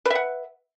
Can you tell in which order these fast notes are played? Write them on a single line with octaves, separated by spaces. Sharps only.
B4 E5 F#5